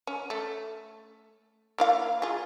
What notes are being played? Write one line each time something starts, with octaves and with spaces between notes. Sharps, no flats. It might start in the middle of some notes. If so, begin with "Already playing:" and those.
C#4
A3
A#3 E4 F5
F4 G#4